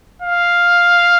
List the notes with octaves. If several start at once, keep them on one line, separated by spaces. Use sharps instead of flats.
F5